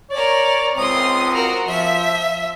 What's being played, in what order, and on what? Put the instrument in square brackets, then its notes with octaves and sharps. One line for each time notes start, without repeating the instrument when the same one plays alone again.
[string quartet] A#4 D5 [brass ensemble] C#5
[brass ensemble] C#2 C4 [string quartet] C6 D#6
[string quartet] F#4 A#4
[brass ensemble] F3 [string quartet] E5